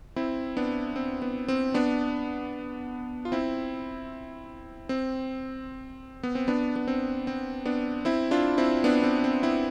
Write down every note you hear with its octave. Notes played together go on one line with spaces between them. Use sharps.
C4 E4
B3 D4
C4
B3
C4
B3 D4
F4
C4 E4
C4
B3
C4
B3 D4
B3
C4
C4
B3 D4
C4 E4
D4 F4
C4 E4
B3 D4
C4
C4
C4 E4